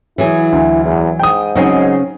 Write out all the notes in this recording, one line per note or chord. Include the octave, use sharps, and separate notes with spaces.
E3 F#3 E4 G#4
D2
E2
G#2 G5 D#6
C#3 F#3 C4 C#4 D#4 G#4